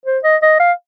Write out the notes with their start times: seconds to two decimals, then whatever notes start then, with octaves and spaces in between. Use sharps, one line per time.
0.06 C5
0.24 D#5
0.42 D#5
0.59 F5